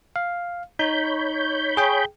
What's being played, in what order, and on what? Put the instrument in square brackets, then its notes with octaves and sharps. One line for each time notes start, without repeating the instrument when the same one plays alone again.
[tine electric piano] F5
[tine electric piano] D#4 [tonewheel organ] C#5 B5 G6
[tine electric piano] G#4 G5